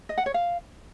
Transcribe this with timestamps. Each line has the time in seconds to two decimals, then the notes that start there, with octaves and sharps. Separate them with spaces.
0.09 D#5
0.18 F#5
0.26 C#5
0.34 F5